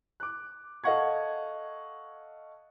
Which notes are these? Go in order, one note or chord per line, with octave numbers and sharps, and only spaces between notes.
D6 F#6
A4 D#5 F5 F#5 C#6 G#6